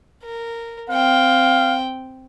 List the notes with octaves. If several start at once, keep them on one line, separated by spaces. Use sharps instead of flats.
A#4
C4 F5 G5